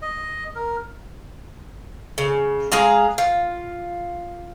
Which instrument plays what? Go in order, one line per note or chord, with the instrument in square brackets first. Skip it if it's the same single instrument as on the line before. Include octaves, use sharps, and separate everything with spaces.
[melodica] D#5
A#4
[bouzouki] C#3
G#3 G#4 F5 A#5
F4